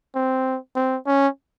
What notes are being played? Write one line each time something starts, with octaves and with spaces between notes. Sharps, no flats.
C4
C4
C#4